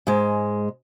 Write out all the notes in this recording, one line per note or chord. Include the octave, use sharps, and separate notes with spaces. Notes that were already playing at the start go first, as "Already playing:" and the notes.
G#2 G#3